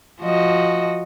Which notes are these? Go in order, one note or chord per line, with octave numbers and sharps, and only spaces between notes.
F3 F#4 D#5